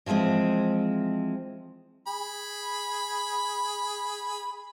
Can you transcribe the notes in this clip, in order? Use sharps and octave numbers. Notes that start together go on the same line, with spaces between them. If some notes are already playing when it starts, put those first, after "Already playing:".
E3 F3 G3 G#3 C4
G#4 B5